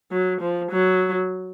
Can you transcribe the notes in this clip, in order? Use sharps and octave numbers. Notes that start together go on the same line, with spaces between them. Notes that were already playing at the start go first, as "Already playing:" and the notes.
F#3
F3
F#3